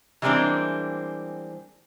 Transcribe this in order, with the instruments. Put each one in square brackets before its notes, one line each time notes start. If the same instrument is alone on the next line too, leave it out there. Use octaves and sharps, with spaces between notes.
[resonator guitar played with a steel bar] E3 G3 G#3 A#3 C4 D4